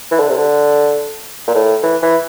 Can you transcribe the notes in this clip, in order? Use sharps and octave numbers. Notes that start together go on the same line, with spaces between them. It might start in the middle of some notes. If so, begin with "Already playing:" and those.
E3
D3
C3
D3
A#2
A2
E3
E3